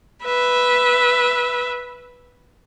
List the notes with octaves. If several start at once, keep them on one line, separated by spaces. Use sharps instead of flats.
B4 E5